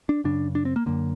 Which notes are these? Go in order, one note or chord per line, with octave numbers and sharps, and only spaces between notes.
D4
F#2 C#3 D4
D4
C4
A#3
F#2 D3 A#3